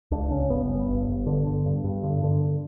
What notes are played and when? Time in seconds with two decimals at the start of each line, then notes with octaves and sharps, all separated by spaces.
0.11 C#2 D4
0.31 C#3 C#4
0.50 G1 B3
0.69 G2
0.89 G1
1.08 G1
1.27 D3
1.47 D3
1.66 G2
1.84 G2
2.03 D3
2.23 D3